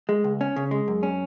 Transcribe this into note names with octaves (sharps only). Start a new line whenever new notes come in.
G#3
C#2
C#4
C#3
G#3
F#2
C#4